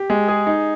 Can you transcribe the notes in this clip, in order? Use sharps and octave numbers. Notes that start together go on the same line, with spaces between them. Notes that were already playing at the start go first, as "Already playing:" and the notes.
Already playing: G4
G#3
G#4
D#4